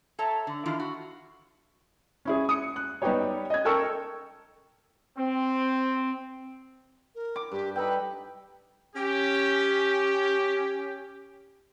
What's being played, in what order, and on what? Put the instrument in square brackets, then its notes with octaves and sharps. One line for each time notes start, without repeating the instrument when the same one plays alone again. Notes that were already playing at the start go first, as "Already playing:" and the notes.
[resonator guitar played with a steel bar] A4 C#5 E5 A5 A#5
D3
D#3 E3 D4 E4 F4
F#4
[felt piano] C#4 E4 G#4
D#6 C#7
F#6
G3 B3 D#4 G4 C#5
D#5 G#6
A4 A#4 G5 C#6 E6
[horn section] C4
[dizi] A#4
[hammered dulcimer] D6
[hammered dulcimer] G2 [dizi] G4
[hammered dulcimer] D#4 A4 G5 [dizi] B4
[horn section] C#4 G4